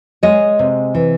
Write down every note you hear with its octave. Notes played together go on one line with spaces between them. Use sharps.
G#3 C#5 D#5
C3
E3